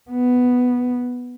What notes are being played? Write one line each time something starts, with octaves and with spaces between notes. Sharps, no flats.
B3